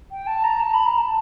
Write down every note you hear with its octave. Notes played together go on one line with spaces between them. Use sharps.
G5
A5
A#5
A5
B5
A#5
A5